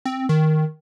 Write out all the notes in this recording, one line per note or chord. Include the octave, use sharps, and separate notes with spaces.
C4
D#3